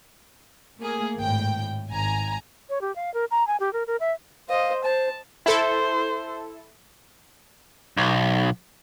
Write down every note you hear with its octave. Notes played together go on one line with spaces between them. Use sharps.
A3 A#3 G#4
G#1 A2 G5
G#1 G#5 A#5
C#5
G4
F5
A#4
A#5
G#5
G4
A#4
A#4
E5
C5 D#5 F5
C5 A5
E4 A4 C5
B1